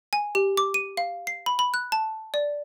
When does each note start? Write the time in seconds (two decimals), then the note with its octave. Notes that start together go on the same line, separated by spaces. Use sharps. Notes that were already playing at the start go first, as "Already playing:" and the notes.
0.13 G#5
0.35 G4
0.57 D6
0.74 D#7
0.97 F5
1.27 C7
1.46 B5
1.59 B5
1.74 F#6
1.92 A5
2.34 D5